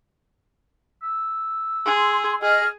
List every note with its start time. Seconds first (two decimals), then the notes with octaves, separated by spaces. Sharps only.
1.03 E6
1.86 G#4 C6
2.42 G#4 D#5 F6